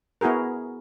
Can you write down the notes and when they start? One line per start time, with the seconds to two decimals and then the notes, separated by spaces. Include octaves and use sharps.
0.21 B3 E4 F#4 G#4 A#4